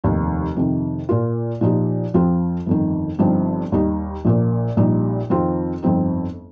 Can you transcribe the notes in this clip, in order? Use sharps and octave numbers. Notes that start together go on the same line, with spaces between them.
F1 D#2 D#3
F2 C3 D#3
A#2 A#3 F4
A#2 F3 D#4 G4
F2 F3 C4 F4
G1 F2 D#3
G1 G2 F3 C4 D#4
D#2 D#3 G3 D#4
A#1 A#2 A#3
A#1 A#2 G3 D#4 G4
F2 D#3 C4 F4
G1 F2 F3 C4 D#4